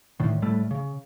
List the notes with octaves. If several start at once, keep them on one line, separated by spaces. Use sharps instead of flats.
D2 A2 D#3
A2 G3 A3
C#3